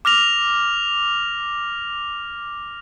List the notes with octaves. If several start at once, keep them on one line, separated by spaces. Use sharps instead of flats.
D6 F6 A#6 F7